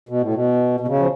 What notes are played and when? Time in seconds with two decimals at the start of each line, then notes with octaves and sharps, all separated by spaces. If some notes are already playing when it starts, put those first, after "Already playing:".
0.09 B2
0.22 A2
0.35 B2
0.80 B2
0.88 C#3
0.99 F3